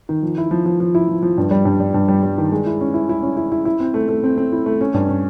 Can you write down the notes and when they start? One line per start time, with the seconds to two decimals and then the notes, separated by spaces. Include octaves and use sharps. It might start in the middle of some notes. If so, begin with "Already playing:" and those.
0.09 D#3
0.23 F3
0.38 E4
0.51 F3
0.66 F3
0.80 F3
0.95 E4
1.08 F3
1.23 F3
1.38 G2
1.51 G3
1.65 G2
1.80 G3
1.94 G2
2.08 G3
2.23 G3
2.38 D#3
2.52 G#3
2.66 E4
2.81 C#4
2.94 E4
3.09 E4
3.22 C#4
3.37 E4
3.52 E4
3.65 E4
3.80 C4
3.94 A3
4.09 A3
4.24 C4
4.38 C4
4.52 E4
4.66 A3
4.81 C#4
4.94 G2
5.09 C#4